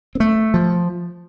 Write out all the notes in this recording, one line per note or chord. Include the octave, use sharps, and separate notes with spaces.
C4
A3
F3